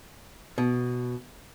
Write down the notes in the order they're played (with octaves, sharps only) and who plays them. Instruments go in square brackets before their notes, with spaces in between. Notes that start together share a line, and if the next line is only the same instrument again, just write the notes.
[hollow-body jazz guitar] B2